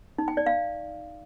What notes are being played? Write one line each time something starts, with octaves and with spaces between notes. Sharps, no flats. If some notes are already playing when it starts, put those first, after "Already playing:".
D#4
G5
D5
F5